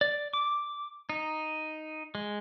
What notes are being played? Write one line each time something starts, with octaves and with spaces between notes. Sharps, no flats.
D5
D6
D#4
G#3